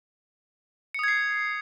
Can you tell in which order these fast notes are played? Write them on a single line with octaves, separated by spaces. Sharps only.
C#7 D#6 G#6 C7